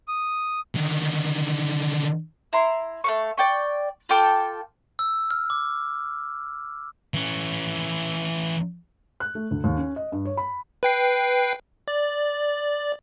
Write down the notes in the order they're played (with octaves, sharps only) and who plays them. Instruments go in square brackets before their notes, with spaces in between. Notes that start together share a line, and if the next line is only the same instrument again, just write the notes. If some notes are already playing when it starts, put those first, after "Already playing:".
[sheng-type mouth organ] D#6
[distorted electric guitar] D3 D#3
[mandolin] E4 A#5 C6
A3 F5 C#6
D5 G5 C#6
F4 A4 G5 D6
[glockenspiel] E6
F6
D6
[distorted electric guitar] E3 C#4
[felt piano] F#6
A3
D2
D#2
C#4
D#5
G2
C#5
B5
[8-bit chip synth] B4 G5 C7
D5